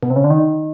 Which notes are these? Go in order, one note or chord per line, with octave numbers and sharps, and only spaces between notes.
B2
C3
C#3
D3
D#3